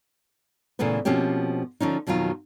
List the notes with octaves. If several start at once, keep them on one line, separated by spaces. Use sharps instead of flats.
A#2 C#3 E3 A3 B3 B4
B2 F3 A#3 C4 C#4 G4
D3 F3 C#4 D#4
F2 B2 D#3 F#3 F4